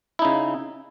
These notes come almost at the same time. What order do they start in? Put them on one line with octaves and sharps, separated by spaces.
E4 D#4 C#3